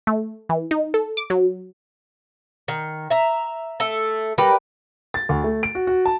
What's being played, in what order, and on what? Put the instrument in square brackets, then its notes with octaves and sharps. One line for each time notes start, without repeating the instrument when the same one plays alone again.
[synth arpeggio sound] A3
E3
D#4
A4
D6
F#3
[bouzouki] D#3
E5 A#5
A3 A4
[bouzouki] G3 [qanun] G4 A#4 B4
[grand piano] A6
D2
A3
D7
F#4
F#4
A5